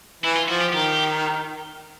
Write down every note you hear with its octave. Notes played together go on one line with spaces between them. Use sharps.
E3 E4
F4
F3 F#4
G4
D#3 G4